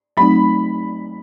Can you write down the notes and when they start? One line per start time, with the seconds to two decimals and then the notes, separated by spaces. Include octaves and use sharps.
0.17 F#3 A3 C4 D#4 B5